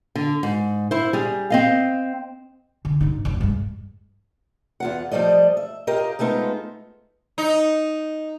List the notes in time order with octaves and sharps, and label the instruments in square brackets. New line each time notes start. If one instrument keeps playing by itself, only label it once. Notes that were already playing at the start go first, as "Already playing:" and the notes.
[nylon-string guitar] D3
G#2
E4 C5
G3 G#4
C4 D#5 F5
[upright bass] D3
G2 D#4
F#1 C#3
G2 G#3
[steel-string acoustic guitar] E2 F4 F#5
F3 G3 A3 D5 D#5
E5
F4 G4 A#4 D#5
G#3 A3 B3 D#4 F4 C5
[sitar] D#4